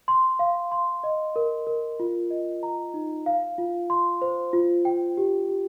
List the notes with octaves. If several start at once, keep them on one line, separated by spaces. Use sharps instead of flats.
C6
F5
C6
D#5
A#4
A#4
F4
D#5
A#5
D#4
F5
F4
C6
C5
F4
G5
G4
G4